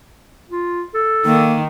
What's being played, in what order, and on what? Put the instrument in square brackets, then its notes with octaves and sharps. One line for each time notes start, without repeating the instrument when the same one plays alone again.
[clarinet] F4
A4
[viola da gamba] D#3 [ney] A#3